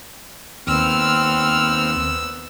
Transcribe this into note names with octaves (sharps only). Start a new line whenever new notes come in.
D#2 B3 C4 E6 F6